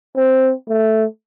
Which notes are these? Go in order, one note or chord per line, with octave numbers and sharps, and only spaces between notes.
C4
A3